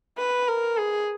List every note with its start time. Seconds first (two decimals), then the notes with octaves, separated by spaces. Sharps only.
0.18 B4
0.48 A#4
0.77 G#4